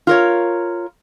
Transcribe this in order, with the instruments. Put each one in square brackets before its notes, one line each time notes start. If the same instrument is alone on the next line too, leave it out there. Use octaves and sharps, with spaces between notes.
[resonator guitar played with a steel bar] F4 A#4 C#5